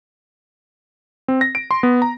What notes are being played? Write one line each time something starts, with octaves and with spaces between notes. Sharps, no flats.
C4
A#6
D7
C6
B3
A#5